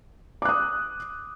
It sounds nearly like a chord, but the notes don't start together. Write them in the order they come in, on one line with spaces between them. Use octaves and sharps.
D6 F#6 D#6